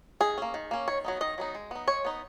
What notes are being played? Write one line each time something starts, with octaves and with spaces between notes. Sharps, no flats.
D#3 G#4
A#3 C#4
D#3
A#3 C#4
D#3 C#5
F#3 B3 D#4
D#3 D#5
F#3 B3 D#4
G#3
B3 D#4
G#3 C#5
B3 D#4